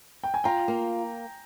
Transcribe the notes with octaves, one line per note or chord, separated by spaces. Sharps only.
G5
G#5
F4 G5 A#5
A#3